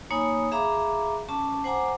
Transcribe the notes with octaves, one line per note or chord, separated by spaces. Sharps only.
A#3 D#4 C#5 G#5 B5 D#6
G#4 E5 F5 A#5 B5 D6
C#4 A5 D6
C5 F#5 G#5 A#5 D6